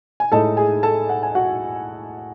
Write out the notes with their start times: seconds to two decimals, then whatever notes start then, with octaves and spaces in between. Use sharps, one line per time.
0.20 G#5
0.32 A2 G#3 D#4 A4 A5
0.57 G#4 G#5
0.83 A4 A5
1.09 F#5
1.23 G#5
1.35 F#4 F#5